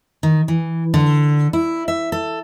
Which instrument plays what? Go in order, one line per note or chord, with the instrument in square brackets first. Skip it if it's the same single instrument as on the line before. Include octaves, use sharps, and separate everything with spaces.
[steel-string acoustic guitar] D#3
E3
D3
E4
E5
A4